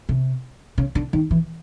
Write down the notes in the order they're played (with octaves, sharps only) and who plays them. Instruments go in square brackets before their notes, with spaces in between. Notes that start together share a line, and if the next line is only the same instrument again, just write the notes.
[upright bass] C3
C#3
D3
D#3
E3